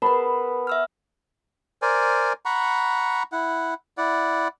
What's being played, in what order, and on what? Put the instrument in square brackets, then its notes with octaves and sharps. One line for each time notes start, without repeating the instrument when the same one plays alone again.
[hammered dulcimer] B3 A5 B5 [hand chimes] A#4 B4
[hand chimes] E5 E6 F6
[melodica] A#4 C5 D5 G#5
F#5 A#5 B5 C#6
E4 F#5
E4 D5 F#5